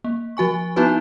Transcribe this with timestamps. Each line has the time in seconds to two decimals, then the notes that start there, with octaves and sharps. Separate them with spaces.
0.04 A#3
0.37 F3 F#4 G#5 C#6
0.76 B3 D#4 E4 F#4 B4